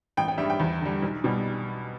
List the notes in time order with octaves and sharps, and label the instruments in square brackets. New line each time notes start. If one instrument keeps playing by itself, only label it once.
[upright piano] A1 G5
G5
G2 G3 E5
G5
E2
D3 G3
B1
B2 G3